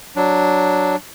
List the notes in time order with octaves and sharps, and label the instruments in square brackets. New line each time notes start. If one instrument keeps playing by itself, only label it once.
[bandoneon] F#3 D4